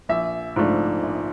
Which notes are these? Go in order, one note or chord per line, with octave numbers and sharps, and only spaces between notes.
A#1 E5
G#2 F3 A3 D4
A#1